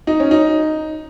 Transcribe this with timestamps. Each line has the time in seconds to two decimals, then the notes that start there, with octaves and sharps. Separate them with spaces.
0.07 D#4
0.20 C#4
0.31 D#4